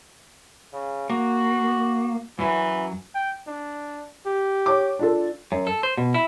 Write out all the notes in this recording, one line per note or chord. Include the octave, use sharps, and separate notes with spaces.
C#3
A#3 F#4
F#2 E3 F#3
G5
D4
G4
C#5 D6
D4 F4 A4
F#2
A4
C5
B2
E4